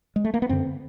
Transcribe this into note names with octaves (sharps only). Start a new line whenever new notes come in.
G#3
A3
A#3
B3
F#2 D3 C4